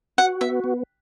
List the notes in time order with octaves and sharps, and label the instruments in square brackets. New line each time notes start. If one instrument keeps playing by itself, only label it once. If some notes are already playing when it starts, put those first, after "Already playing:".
[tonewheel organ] F#4 [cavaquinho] F#5
[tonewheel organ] B3 [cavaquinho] E5
[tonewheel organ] B3